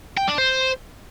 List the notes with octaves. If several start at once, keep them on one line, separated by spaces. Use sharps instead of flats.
G5
D4
C5